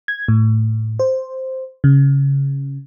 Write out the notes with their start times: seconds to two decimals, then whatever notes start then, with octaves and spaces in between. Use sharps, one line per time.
0.08 G#6
0.28 A2
0.99 C5
1.84 C#3